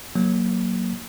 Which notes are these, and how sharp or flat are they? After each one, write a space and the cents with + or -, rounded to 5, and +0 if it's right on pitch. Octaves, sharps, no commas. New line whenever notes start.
F#3 +0 A#3 +0